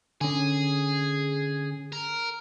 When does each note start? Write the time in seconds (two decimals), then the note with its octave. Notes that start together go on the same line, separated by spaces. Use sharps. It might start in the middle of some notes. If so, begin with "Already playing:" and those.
0.21 D3 C#4 G#4
1.92 A#4